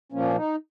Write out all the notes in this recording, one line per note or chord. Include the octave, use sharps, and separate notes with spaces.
A#2 F3 A#3 C#4
D#4